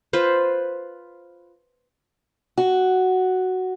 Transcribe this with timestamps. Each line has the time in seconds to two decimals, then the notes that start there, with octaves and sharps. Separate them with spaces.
0.13 F4 B4 C5
2.58 F#4